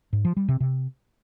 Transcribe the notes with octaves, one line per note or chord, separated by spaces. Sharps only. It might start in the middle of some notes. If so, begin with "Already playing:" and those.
G#2
F3
G3
C3
C3